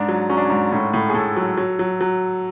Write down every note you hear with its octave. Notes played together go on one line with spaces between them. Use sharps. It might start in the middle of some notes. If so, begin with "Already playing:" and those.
Already playing: G#2 D4
F#3
F#3 C#4
D4
C#4
G#2
A2 C#4
A2
G#4
A2 A4
F#3
F#3
F#3
F#3